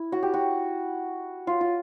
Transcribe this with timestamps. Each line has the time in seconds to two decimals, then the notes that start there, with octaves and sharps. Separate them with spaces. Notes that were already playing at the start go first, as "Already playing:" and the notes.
Already playing: E4
0.12 F#4
0.23 G4
0.34 F#4
1.47 F4
1.61 F4